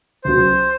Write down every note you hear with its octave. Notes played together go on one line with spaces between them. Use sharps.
C#2 C#3 F#3 C5